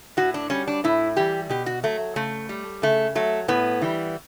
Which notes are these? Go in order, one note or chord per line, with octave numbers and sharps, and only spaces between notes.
A2 F#4
D4
G3 C#4
D4
A2 E4
E3 G3 G4
B2 G4
F#4
F#3 A3
C#3 A3
G3
C#3 A3
F#3 A3
A2 B3
E3 G3